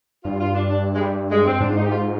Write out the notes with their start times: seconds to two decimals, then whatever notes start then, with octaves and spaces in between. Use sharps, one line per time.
0.24 G2 F4
0.40 F4
0.55 D4
0.70 D4
0.95 G#3
1.00 G3
1.31 G#3
1.46 C4
1.60 G#2 D4
1.69 F4
1.77 D#4
1.86 G4
1.91 F4